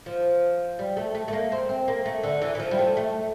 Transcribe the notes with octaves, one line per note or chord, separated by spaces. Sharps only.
F3
G3
A3
A3
A3
A#3
C4
C4
A#3
A3
D3
E3
E3
F3
G3
A3
A3